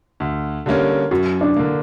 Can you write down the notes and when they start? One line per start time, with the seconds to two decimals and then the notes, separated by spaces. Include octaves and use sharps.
0.20 D2
0.66 D3 G3 A#3 C#4
1.11 F#2 F#4
1.41 D4
1.56 D3 A#3